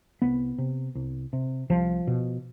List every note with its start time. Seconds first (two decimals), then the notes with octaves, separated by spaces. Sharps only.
0.22 C2 B3
0.58 C3
0.95 C2
1.33 C3
1.70 C2 F3
2.07 B2